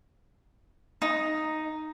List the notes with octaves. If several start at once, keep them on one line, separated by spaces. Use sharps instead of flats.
D#4